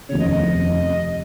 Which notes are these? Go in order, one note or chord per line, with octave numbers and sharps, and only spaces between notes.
F1 D#2 C#3 C#5
D#5
D#5
F2 C3 D#3
C3